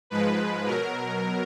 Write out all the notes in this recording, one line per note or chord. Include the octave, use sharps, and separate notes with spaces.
G#2 F3 G#3 B4
B2 F#3 A#4